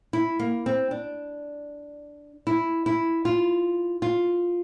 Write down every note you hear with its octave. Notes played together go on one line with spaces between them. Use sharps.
E4
A#3
C4
D4
E4
E4
F4
F4